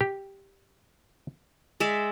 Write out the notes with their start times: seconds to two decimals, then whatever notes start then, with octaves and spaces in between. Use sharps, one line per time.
0.01 G4
1.80 G#3 D5 E5